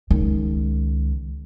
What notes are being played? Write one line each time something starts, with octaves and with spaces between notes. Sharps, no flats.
C#2 D#3